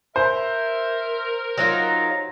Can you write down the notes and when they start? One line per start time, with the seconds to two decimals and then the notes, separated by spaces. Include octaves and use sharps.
0.16 A#4 C5 E5
1.58 F#3 D#4 F4 A#5